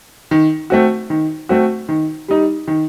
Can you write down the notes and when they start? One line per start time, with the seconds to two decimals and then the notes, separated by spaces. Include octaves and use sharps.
0.31 D#3
0.70 A3 C4 F#4
1.10 D#3
1.49 A3 C4 F#4
1.89 D#3
2.28 G3 D#4
2.68 D#3